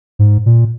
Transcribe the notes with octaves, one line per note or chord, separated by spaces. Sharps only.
G#2
A#2